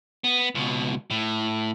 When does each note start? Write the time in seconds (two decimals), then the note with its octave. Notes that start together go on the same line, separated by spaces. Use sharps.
0.24 B3
0.55 C#2 B2
1.10 A2